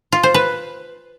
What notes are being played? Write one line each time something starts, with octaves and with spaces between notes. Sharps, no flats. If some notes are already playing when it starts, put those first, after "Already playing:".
F4
C5
B4